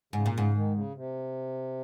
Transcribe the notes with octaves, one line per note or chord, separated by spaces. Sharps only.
G#2 C#3
A#2
G#2 C#3
D#3
C#3
C3